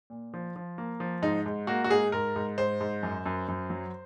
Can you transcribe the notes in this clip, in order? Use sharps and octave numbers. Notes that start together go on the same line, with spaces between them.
A#2
F3
F3
A#3
F3
G#2 D#4
G#2
A#3 F#4
F#4
G#2 G#4
G#2 A#4
G#2
G#2 C5
G#2
F#2
F#2
F#2
F#3